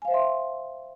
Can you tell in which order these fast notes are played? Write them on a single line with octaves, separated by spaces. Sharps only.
G#5 F5 C5 E5 C6